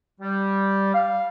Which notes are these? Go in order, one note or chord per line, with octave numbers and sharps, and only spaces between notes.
G3
F5